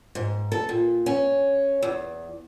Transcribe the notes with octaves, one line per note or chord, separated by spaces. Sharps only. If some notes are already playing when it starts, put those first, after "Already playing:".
G#2
A4
A#2
C#4
E2